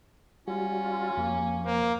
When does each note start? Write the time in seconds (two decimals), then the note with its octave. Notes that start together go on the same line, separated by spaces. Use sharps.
0.48 G3 C#4 F4 F#4
1.17 F2 A#3
1.65 A#3 C5